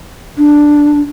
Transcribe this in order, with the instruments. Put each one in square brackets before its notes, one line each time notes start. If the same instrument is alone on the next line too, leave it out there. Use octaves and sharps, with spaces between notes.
[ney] D4